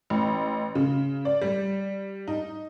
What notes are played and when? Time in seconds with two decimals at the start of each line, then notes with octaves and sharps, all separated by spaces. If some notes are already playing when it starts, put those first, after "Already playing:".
0.10 A1
0.75 C#3
1.25 D5
1.42 G3
2.28 D#4